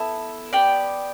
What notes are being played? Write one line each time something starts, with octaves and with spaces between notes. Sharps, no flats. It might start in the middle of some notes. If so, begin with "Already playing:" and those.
Already playing: B3 E4 A4
B3 G4 D5 G5